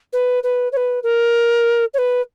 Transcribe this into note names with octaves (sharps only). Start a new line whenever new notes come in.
B4
B4
C#5
B4
A#4
C#5
B4